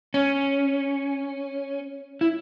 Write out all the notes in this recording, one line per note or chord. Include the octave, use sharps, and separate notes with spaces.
C#4
E4